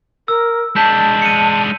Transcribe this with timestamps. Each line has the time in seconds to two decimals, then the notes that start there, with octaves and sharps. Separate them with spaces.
0.28 A#4 E6
0.76 G#3 D4 A5 G6 B6
1.22 C#7 D#7